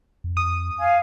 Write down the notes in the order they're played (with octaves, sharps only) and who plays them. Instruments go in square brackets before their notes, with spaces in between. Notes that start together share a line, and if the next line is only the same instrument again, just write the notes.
[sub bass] F2
[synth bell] D#6 D#7
[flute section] F5 G#5